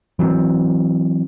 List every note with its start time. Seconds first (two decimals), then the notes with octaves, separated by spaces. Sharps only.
0.19 E3 F#3 A#3 C4